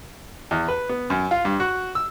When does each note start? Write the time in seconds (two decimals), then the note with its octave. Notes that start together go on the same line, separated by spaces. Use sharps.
0.51 E2
0.68 B4
0.89 B3
1.10 F#2
1.31 F4
1.45 G2
1.60 F#4
1.95 E6